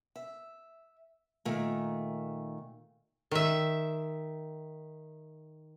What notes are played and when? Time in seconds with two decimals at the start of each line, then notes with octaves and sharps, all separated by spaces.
0.16 E5
1.45 A#2 D#3 A3
3.31 D#3 E5